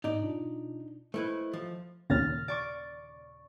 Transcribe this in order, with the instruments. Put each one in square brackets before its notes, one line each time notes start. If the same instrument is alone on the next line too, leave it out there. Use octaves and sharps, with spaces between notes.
[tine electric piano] G#2 [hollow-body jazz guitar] D#4 D5
[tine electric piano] B2 D4 F4
[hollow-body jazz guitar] A3 E4 B4 [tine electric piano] C5 D#5
[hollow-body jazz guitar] F3
[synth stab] D#2 A#2 C#3 [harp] F6 A6 A#6
[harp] D5 C#6 D7